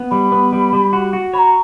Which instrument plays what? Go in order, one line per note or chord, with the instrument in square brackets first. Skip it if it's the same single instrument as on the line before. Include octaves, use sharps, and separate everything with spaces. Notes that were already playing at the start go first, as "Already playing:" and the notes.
Already playing: [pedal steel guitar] B3
[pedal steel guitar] G3 [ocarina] B5
[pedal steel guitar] B3
G3
G3
F#4
F#4
[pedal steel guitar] C#5 [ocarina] B5
[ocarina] A#5